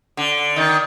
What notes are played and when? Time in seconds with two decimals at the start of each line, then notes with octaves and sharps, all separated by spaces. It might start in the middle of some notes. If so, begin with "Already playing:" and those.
0.17 D3
0.56 D#3